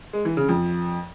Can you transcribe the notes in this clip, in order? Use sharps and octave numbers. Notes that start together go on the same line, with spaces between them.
G#3
E3
C#3
F2